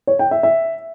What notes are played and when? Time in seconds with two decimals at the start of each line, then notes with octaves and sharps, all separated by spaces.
0.07 C#5
0.19 G5
0.31 E5
0.43 E5